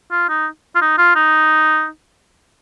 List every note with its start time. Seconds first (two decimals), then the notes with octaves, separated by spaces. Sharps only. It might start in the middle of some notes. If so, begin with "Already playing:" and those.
0.11 F4
0.29 D#4
0.75 F4
0.82 D#4
0.98 F4
1.15 D#4